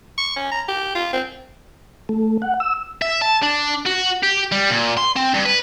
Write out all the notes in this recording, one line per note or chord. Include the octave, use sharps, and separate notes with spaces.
C#6
C#4
A#5
G4
F4
C4
A3
F#5
E6
E5
A5
D4
F#4
G4
G3
A#2
C6
C4
G2
B4